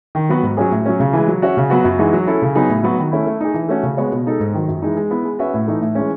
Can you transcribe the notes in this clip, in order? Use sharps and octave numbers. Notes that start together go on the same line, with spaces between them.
D#3
F#3 B3 F#4
G#2
F#3 C#4 G#4
A2
F#3 C#4
C#3
E3 G#3
F#3
C#4 F#4 C#5 E5
C#3
F#3 B3 F#4
F#2
E3 G#3 D#4 F#4
F#3
C#4 E4 A4
C#3
F#3 B3 D#4 G#4
A2
F#3 B3 F#4
D#3
A3 C#4 E4
A3
D#4 G#4
E3
A3 C#4 F#4
C#3
G#3 B3 F#4 C#5
B2
G#3 D#4 A4
G#2
D#3 F#3
F#2
E3 G#3 D#4
G#3
B3 E4
G#3
C#4 F#4 B4 E5
A2
E3 A3 D#4
A2
E3 G#3 C#4